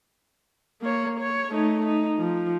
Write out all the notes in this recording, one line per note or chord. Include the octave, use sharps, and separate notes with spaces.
A#3 C#5
C#5
A3 D#4
D#4
F3